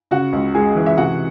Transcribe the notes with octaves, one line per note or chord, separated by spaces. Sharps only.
C#3 F#4 F#5
C#2
G#3 G#4 G#5
E3
E5
C3 F#4 F#5